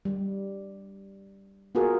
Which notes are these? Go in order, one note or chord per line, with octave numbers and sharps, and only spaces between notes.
G3
B3 F4 F#4 G#4 A#4